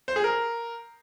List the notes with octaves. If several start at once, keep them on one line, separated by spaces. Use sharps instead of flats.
C5
G#4
A#4